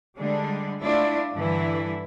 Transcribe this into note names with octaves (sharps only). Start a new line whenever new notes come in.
D3 G3 G#3 D4
A3 D4 E4 F4
G2 D3 E3 E4